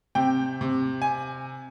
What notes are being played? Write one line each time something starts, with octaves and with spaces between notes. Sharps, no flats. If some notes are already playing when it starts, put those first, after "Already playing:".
C3 G5
C3
G#5